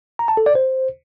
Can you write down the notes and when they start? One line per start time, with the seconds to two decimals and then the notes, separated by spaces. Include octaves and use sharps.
0.19 A#5
0.28 A5
0.37 A4
0.46 D5
0.55 C5